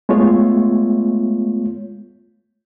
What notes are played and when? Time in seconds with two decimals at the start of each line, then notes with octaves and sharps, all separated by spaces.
0.09 G#3 A3 B3 F4 C#5